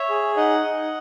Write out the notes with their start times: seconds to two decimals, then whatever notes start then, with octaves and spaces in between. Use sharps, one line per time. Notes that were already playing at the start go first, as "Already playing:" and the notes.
Already playing: C#5 E5
0.09 G#4
0.37 D#4 D#5 F#5
0.65 D#4